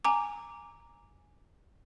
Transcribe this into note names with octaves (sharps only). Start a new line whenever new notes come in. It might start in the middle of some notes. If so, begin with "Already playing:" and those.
G#5 A#5 D6